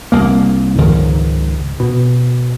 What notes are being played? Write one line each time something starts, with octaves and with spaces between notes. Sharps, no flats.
C2 A#3
C#2 G#2 D#3 F3
B2